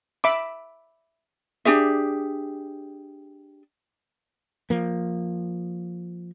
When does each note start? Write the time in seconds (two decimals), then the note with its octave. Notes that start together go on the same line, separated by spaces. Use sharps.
0.24 E5 B5 D6
1.65 D4 G4 G#4 E5
4.70 F3 A#3